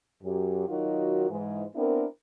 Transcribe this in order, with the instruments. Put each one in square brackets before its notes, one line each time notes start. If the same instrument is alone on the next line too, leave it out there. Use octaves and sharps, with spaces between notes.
[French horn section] F#2 F#3 G4
D#3 F#3 D#4 F4 F#4 A#4
G#2 E3 G#3
B3 C4 D4 E4 A#4